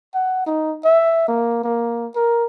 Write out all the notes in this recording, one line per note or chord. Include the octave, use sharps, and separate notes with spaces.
F#5
D#4
E5
A#3
A#3
A#4